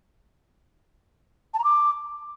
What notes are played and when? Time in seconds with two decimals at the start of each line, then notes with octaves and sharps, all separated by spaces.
1.54 A5
1.59 A#5
1.64 D6